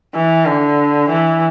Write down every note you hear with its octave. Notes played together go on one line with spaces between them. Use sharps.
E3
D3
E3